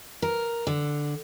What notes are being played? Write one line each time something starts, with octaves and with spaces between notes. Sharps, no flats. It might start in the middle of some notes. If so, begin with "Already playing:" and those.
A#4
D3